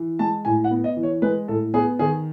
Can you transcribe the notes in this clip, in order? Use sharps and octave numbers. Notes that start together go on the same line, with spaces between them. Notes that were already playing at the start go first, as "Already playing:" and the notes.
Already playing: E3
G#3 A5
A2 G#5
F#5
B3
D#5
E3
C#5
G#3 B4
A2 A4
B3 G#4
D#3 G#4